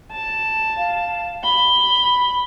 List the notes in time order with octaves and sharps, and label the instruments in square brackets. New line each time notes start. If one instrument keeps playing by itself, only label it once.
[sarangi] A5
[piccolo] F5
[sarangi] B5 [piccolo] G7